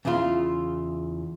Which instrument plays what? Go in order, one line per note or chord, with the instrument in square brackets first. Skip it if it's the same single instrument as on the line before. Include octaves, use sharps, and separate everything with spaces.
[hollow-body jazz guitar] E2 C#3 E4 F4